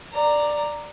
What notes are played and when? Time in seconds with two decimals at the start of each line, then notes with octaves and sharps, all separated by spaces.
0.13 D5 A#5